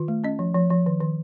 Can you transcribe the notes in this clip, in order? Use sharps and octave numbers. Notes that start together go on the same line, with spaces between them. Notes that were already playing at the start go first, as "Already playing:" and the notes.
Already playing: D#3 F4
A3
C#4 D#5
F3
F3
F3
D#3
D#3